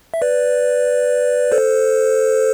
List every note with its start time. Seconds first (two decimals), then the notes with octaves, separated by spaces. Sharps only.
0.14 E5
0.22 B4 D5
1.52 A4 C5